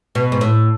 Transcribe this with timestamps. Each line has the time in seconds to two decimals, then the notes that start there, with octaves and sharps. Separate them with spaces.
0.15 B2
0.32 G#2
0.41 A2